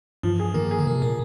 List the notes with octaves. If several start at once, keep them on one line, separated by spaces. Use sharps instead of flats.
G2 F3
G#4
D#3 A#3
G#4
D3
C3 A#3
A#2 A#3